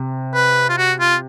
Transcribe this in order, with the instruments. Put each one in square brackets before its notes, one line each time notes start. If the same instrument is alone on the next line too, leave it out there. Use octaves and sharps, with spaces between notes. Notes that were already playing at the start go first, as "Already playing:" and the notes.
Already playing: [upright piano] C3
[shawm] B4
F4
F#4
F4